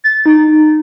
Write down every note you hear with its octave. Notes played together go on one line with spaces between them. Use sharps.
A6
D#4